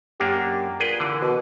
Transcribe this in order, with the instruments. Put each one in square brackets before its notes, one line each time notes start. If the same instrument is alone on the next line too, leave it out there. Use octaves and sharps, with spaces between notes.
[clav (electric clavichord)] F#2 A#3 D4 [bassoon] G4
[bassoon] A#2 [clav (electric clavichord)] G#4 B4 G5
[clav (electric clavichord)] D3 E3
[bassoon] B2